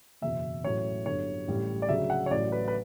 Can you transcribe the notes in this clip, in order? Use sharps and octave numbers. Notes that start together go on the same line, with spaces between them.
F#1 E2 B2 E5
A1 A2 F#3 C#5
G1 G2 D3 F#3 C#5
A1 A2 G3
D5
D2 C#3 F#3 E5
F#5
C#5
A1 A2 F#3 D5
B4
B4